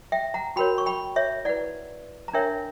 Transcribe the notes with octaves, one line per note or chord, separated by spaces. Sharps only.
E5 G5
F#5 A#5
F#4 A#4 C#5 G5 B5
C#6
G5 B5
C#5 E5
E4 B4 D5 F#5
A#5
D4 A#4 C#5 E5 G5